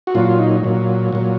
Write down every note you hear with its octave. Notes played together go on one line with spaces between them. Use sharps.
F#4
A#2 F#3 F4
F4
D#4
A#2 F#3
A#2 F#3